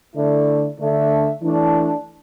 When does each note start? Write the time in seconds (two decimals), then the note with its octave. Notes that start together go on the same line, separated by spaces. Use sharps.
0.14 D3 A3 E4 A4 D5
0.78 D3 A3 D4 A4 E5
1.42 E3 A3 D4